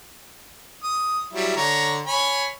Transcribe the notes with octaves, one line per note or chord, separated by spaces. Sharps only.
D#6
F#3 G3 E4
D3 C#5 A#5
C#5 G#5 B5